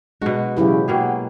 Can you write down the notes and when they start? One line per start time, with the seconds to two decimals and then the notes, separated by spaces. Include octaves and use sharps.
0.22 B2 G#3 D4 F#4
0.57 C#3 E3 F#3 E4 G4
0.88 B2 A#3 F#4 G#4 G5